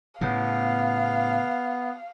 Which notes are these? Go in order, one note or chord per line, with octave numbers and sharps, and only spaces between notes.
A2 C#3 B3 F5